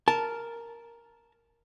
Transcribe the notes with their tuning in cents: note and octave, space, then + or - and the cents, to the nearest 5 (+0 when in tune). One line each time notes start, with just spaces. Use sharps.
A#4 +0 A5 -10